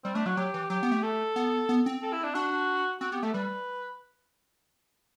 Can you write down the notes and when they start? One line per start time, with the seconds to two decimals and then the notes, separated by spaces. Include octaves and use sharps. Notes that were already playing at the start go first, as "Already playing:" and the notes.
0.04 G3 C4
0.15 A3 D4
0.26 F#3 F#4
0.37 F#3 G4
0.54 E3
0.70 F#3 G4
0.83 B3
0.92 A3
1.03 A4
1.36 B3
1.69 B3
1.86 C4
2.02 A4
2.13 E4
2.24 D4
2.34 D4 F#4
3.01 C4 F#4
3.12 B3 G4
3.23 A3 A4
3.34 G3 B4